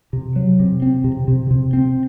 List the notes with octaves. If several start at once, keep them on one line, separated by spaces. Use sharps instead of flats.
C3
F#3
C3
C4
C3
C3
C3
C4